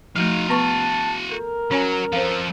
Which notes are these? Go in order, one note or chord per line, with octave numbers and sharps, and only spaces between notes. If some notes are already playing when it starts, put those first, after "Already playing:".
F3 A3 D#4 F#4 F5
B3 B4 A5 C#6
A4 A#4
F#3 C#4 C#5 G#5
F3 A4 C5 F5